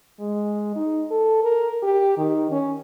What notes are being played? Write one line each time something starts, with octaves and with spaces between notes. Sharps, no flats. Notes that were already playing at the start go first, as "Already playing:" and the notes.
G#3
D#4
A4
A#4
G4
D#3
C#4